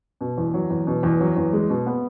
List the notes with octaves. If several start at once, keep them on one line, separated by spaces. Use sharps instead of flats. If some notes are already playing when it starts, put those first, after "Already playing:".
B2
E2
F#3
E2
B2
E2
F#3
E2
G#3
B2
B3